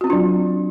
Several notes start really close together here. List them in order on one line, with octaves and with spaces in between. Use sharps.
F#4 C4 F4 D4 F#3